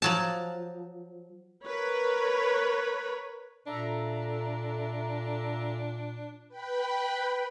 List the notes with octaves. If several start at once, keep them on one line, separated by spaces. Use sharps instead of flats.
F3 F#3 A5
A#4 B4 C#5
A#2 D4 A4 E5 A#5
B4 G5 B5